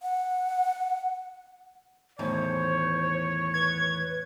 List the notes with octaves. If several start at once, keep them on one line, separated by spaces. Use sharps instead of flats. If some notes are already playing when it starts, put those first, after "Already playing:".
F#5
E2 A2 D#3 C5 C#5
B4 G#6